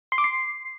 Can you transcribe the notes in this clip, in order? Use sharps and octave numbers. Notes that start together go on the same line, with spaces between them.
C6
D6
C7